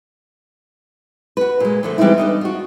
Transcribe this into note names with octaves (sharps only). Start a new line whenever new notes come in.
F#4 B4
A#2 G#3
D3 F3 A3
E3 G3 G#3 C4 D#4 E4
D4 D#4 D#5
F4 F#4